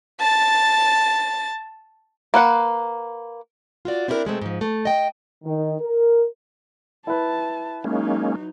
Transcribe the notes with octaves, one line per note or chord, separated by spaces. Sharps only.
A5 A6
A#3 B4 F#5
F4 F#4 D5
C4 D4 E4 G4 A#4
B2 G#3 A3 C4
G#2 F3
A3
D#5 G5
D#3
A#4
E4 B4 A5
F#3 G#3 A#3 C#4 D#4